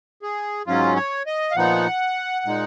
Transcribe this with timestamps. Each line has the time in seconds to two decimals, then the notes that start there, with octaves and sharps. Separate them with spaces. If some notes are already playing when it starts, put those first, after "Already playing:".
0.22 G#4
0.67 G#2 F#3 C#4 F4
0.96 C#5
1.26 D#5
1.51 F5
1.56 A#2 F3 B3 D#4 F#5
2.45 A#2 G#3 D#4